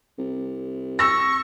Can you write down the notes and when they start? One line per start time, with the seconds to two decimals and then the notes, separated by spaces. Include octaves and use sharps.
0.19 C2
0.99 C#6 E6 A#6